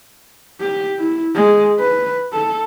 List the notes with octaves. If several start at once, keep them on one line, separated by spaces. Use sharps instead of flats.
G4
E4
G#3
B4
A4